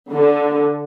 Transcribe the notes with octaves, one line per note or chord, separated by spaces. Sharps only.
D3